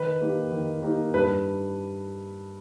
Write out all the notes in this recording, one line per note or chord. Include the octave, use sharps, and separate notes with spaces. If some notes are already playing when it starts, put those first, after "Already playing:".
Already playing: D#3 B4
A#3 D#4 G4
D#3
A#3 D#4 G4
G2 B4